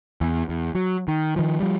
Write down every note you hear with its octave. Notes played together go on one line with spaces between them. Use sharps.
E2
E2
F#3
D#3
D#3 F3
F3 G3